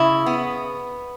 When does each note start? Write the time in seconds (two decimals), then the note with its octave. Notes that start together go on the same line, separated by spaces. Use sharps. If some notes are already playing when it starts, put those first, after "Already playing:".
Already playing: C#3 E4
0.26 B3